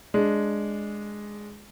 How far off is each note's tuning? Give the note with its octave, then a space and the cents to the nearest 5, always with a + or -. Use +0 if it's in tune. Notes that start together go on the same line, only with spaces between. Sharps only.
G#3 +0 D4 +0